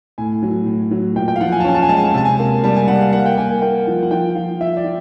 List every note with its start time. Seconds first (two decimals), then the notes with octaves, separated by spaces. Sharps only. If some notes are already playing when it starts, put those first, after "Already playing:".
0.18 A2 G#5
0.43 F#3
0.66 A2
0.91 F#3
1.16 A#2 G5
1.28 G5
1.36 F5
1.41 F3 F#5
1.52 G#5
1.60 A5
1.64 C#4 G#5
1.75 A5
1.82 G#5
1.89 G#3 A5
1.97 G#5
2.04 A5
2.11 G#5
2.14 C3 A5
2.25 G#5
2.39 A#3
2.64 G3 A5
2.76 G#5
2.88 G3 F#5
3.01 F5
3.13 A#3 F#5
3.26 G5
3.38 A#3 G#5
3.49 G#5
3.61 A#3 G5
3.87 F3
4.03 F#5
4.11 F3 G5
4.35 F3 F5
4.60 F3 E5
4.77 D5
4.84 F3